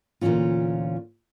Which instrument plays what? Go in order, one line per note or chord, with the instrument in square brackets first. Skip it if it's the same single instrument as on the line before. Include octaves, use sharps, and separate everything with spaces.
[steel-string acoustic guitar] D2 A#2 D#3 E3 C#4 F4